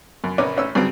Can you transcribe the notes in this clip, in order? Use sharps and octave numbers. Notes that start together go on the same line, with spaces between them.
F#2
A#1 C#4 A#4 B4 D6
A1 C#4 E6
G2 C#3 F#3 C4